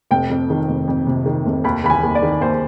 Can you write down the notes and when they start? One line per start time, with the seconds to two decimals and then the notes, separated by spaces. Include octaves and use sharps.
0.11 F1 G5
0.30 F2
0.50 D#3
0.68 F1
0.88 F2
1.07 C3
1.26 D#3
1.46 F1
1.64 D#2 B5
1.84 D#2 B5
1.90 G#5
2.03 D#2
2.15 D5
2.22 D#3
2.41 D#2 C5